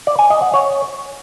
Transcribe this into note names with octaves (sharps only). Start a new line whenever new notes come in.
D5
G#5
D#5
F#5
C#5